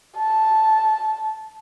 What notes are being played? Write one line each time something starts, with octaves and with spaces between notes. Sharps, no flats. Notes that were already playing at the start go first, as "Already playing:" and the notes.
A5